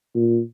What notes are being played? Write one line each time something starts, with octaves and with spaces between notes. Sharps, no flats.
A#2